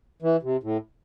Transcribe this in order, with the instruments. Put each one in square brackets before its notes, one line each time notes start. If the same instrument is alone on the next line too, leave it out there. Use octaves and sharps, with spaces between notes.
[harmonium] E3
C3
A2